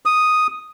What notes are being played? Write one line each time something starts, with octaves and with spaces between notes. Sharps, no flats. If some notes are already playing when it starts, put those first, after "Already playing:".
D#6